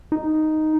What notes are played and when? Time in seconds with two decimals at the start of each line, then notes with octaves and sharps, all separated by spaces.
0.12 D#4